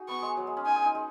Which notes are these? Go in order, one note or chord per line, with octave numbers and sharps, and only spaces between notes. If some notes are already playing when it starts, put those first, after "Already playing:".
Already playing: D#4 F#4 G#4
B3 C#6
G#3
F#3
G#3
C#4
D#4 G#5
G#4
D#4
G#3